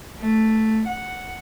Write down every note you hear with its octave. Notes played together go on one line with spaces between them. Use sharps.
A3
F#5